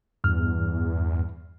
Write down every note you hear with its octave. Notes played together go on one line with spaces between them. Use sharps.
E2 G2 F6